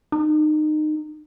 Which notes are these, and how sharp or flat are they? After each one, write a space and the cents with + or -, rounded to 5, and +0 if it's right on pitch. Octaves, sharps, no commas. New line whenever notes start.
D#4 -25